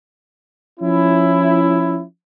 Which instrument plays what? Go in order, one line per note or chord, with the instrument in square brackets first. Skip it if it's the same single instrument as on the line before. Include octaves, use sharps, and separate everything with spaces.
[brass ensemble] F3 C#4 E4